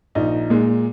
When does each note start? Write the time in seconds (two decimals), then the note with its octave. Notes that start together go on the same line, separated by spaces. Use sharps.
0.15 A#1 D#4
0.50 A#2 G#3